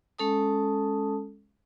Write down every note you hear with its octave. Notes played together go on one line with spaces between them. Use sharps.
G#3 C#4 A4 A5 D#6